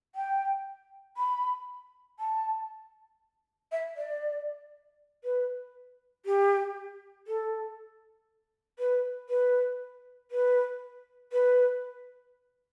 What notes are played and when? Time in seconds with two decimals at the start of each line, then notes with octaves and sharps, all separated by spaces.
0.15 G5
1.17 B5
2.20 A5
3.72 E5
3.97 D5
5.24 B4
6.26 G4
7.27 A4
8.79 B4
9.29 B4
10.31 B4
11.33 B4